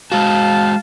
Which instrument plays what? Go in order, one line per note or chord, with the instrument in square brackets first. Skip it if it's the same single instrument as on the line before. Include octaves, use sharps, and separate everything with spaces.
[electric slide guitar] G#3 F#4 [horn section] F5 A5